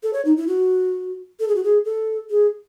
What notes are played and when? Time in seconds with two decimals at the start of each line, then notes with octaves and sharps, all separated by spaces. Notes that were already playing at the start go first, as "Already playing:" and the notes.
0.03 A4
0.13 C#5
0.25 D#4
0.37 E4
0.48 F#4
1.40 A4
1.48 G#4
1.55 F#4
1.64 G#4
1.85 A4
2.30 G#4